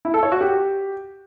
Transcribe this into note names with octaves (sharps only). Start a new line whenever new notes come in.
E4
A4
C#5
F#4
G4